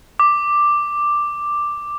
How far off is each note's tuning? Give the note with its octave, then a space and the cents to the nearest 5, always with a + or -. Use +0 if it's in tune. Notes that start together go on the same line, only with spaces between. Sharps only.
D6 +5